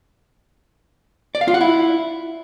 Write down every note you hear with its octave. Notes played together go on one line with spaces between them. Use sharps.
D5
F5
F4
F#5
E4